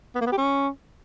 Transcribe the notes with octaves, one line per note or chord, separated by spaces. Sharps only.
B3
A#3
B3
G4
C#4